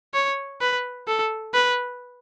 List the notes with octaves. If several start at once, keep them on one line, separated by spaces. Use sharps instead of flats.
C#5
B4
A4
B4